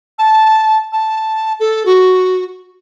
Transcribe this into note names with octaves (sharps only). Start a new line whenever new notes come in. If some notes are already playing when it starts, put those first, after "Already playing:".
A5
A5
A4
F#4